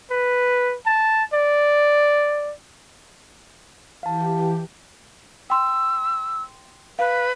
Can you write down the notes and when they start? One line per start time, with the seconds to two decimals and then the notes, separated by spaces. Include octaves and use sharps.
0.11 B4
0.86 A5
1.33 D5
4.03 E3 G4 F5 A5
5.50 G5 C6 E6
6.99 B4 F5